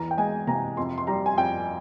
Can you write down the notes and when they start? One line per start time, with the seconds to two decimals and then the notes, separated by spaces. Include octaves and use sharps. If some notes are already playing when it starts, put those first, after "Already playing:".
Already playing: E2 E3 A#5
0.11 G5
0.17 G#3 G#5
0.47 C3 A#5
0.77 F2 C6
0.98 C6
1.07 G3 A#5
1.26 G#5
1.37 F2 G5